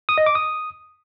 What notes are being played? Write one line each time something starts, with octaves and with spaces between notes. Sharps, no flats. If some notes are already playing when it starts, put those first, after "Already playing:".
D#6
D#5
D6
D#6